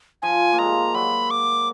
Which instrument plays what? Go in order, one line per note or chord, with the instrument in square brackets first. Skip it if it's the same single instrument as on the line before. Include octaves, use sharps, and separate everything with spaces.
[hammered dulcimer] F3 [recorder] G#5
[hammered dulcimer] A#3
[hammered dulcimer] G#3 [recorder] A#5
[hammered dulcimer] F#3 [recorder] B5
[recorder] D6